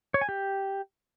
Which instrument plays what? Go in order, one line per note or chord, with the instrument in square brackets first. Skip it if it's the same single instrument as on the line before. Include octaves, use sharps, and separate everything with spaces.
[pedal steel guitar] C#5
G#5
G4